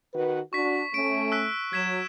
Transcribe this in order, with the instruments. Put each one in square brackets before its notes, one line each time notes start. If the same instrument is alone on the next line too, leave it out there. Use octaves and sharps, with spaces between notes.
[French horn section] D#3 F#4 B4
[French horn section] D4 F#4 [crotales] C#6 B6
[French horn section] A3 C#4 [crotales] D7
[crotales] E6 F#6 B6
[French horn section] F#3 [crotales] G#6 B6 E7